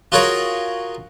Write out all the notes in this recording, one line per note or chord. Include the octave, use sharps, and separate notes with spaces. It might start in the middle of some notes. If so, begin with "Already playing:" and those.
F4 F#4 G#4 A#4 C#5